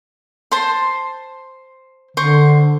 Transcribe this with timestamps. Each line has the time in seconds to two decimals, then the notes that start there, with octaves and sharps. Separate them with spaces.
0.52 C5 A5 C6
2.17 D3 C5 C#6